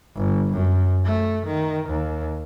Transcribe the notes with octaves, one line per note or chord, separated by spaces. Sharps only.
G1
F#2
A3
D#3
D#2